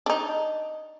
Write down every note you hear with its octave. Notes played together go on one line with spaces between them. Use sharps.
D4 D#4